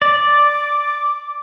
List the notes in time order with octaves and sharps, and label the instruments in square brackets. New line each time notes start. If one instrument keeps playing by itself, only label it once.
[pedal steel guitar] D5 [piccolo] D6